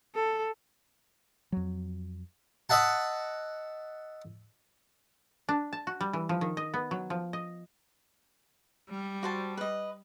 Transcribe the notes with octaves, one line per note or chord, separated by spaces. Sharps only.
A4
F2 F#3
D#5 E5 F#5 A5
D4
A5
F#4
G3
E3
F3
D#3
D#5
B3
F#3
F3
D#5
G3
F#4 C5 A5
B4 D#5